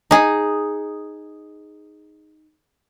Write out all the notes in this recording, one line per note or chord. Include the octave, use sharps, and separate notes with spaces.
D#4 G#4